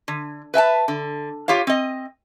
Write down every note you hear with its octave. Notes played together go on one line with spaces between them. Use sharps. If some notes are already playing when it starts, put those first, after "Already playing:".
D3
B4 E5 G#5 A5
D3
F4 G4 C#5 F5
C4 D#5